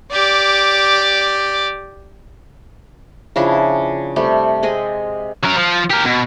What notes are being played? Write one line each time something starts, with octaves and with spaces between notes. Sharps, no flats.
G4 D5
C#3 F3 D4 E4
C3 G3 A3
G#3 C4 G#4 D#5
F#3 A#4
F3
G4 A#4
B2